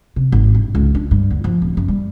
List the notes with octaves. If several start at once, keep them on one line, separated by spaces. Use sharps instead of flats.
C3
G#1
G2
C#2
D4
G2
D2
F3
D1
F#2
G3